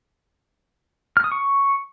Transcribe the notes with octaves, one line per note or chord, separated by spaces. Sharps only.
F6
D#6
C#6